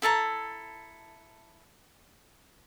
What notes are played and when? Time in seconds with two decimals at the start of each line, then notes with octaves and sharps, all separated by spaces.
0.02 E4 A4 A5 A#5